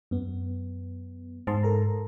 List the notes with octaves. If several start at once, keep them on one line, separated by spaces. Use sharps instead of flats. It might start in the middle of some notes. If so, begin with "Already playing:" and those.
F#2 B3
G#2 C5 A5 C6
A4 A#4 A#5